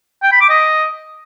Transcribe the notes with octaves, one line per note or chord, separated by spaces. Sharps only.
G5
B5
D6
D#5